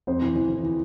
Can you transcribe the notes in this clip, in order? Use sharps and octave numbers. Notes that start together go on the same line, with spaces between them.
F2 C5
E3
E3
E3
E3